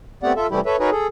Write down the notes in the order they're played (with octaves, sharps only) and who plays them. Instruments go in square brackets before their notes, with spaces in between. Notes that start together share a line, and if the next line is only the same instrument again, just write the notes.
[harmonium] A3 B3 C4 G4 D5 F#5
F4 A4 E5
C3 E3 G3 A3 E4 G4
A4 B4 C#5 E5
D#4 F#4 G#4 A#4 B4 C#5
G#4 A4